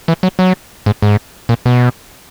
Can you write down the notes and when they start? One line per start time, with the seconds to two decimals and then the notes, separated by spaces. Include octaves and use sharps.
0.08 E3
0.23 F#3
0.39 F#3
0.86 G#2
1.02 G#2
1.49 A#2
1.66 B2